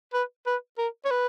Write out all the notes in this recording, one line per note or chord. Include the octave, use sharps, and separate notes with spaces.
B4
B4
A#4
C#5
B4